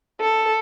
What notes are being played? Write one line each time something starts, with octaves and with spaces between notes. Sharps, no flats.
A4